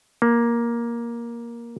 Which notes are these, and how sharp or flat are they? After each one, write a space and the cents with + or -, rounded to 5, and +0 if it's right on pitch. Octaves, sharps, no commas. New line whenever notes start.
A#3 +10